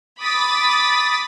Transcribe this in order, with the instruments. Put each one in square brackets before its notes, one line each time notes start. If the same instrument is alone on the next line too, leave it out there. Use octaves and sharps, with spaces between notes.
[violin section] B5 D6 D#6 A6 B6